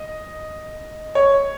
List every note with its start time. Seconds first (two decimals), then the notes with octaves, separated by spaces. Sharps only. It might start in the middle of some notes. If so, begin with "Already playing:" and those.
Already playing: D#5
1.15 C#5